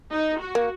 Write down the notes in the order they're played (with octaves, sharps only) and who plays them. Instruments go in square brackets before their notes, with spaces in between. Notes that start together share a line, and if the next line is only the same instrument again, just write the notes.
[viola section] D#4
F#4
[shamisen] A#3